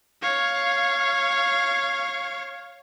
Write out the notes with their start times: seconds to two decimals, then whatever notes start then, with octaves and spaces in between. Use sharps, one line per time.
0.22 C#5 F5